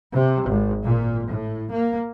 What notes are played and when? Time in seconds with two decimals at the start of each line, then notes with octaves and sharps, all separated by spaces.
0.14 C3
0.47 G#1
0.84 A#2
1.29 A2
1.72 A#3